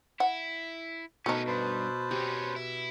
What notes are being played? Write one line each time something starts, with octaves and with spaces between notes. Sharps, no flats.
E4 F#5
B2 A3 C#4 D#4 A#4 B4
G2 B4 C5 A5
C4 C#4 G4
E4